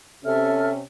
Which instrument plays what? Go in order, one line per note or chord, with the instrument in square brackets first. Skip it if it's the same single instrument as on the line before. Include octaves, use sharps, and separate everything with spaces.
[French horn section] C3 C#4 [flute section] A4 E5 F6